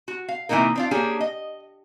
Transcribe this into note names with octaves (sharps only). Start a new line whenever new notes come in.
F#4
F5
C3 E3 F3 A#3 D#4 A#4
C4 D4 F4
A#3 C#4 D4 G4 G#4
D#5